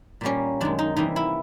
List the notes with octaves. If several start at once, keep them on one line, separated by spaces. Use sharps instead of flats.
A#2 G3 A#3 C#4
F#2 D#3 G#3 D4
D#4
C3 E3 G3 A#3 D#4
E4